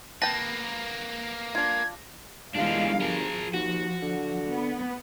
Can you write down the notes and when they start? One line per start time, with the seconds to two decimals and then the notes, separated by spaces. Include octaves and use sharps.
0.22 A#3 B4 G5 A5 A#6
1.55 D4 F4 G#6
2.56 G1 E3 G#3 D4 F5
3.01 F3 G#4 A#4
3.54 D#2 F#4
4.02 D3
4.49 B3